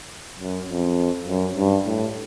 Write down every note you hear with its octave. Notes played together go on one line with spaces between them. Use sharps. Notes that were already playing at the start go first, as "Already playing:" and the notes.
F#2
F2
F#2
G2
A2